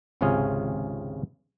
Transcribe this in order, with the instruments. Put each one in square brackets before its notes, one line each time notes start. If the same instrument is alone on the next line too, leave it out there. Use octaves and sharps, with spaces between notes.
[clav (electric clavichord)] G#1 C#2 C3 C#4 F4 G#4